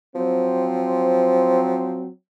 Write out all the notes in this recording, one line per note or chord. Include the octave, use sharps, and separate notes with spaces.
F3 F#3 C4